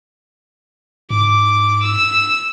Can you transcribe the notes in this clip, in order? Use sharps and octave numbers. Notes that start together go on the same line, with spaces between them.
G#2 D6
E6